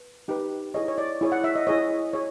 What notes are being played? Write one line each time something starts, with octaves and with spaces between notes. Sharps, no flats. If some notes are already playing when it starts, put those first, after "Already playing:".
Already playing: B4
D#4 G4 B4
E4 G#4 C#5 D#5
C#5
D5
E4 G#4 C#5
F#5
E5
D#5
E4 G#4 C#5 D#5
G#4 C#5